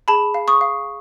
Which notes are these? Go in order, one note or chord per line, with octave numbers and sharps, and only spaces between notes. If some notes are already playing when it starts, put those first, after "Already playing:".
G#4 A5 B5
F5
C#6 D#6
F5